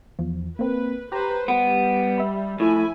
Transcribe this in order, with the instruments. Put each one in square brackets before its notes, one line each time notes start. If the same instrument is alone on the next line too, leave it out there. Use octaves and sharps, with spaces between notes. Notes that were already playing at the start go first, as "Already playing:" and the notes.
[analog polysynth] E2 F3
[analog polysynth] A#3 C4 [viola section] B4
[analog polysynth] G4 A#5 [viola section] B4 C5
[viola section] G3 [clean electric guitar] B3 [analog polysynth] D7
[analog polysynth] E5 B5
[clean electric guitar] A2 [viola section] F3 E4 G#5